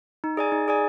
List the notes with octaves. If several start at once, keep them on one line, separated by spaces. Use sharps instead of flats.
D#4
G#4 D5 G#5
D#4
G#4 D5 G#5